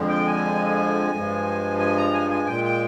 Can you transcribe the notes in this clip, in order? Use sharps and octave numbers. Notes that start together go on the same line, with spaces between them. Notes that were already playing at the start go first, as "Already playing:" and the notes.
Already playing: F2 D3 F3 G#3
G5
G#5
G2 F3 G#3
G#5
A#5
G#5
G#5
A#2 G#3 G5
G5